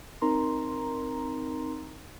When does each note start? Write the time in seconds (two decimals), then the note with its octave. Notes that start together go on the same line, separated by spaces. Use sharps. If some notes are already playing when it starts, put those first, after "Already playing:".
0.21 C4 D#4 A#4 A#5 C6